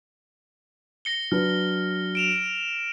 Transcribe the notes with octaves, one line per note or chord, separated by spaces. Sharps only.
A#6 C#7 G7
F#3 D4 B4 F6
D7 E7 F7